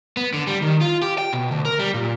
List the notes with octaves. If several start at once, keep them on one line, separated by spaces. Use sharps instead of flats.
B3
D3
G3
D#3
F4
G4
G5
B2
D2
A#4
G3
A#2